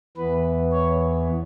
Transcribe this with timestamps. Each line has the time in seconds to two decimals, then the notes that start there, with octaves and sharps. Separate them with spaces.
0.17 E2 E3 B3 B4
0.72 C#5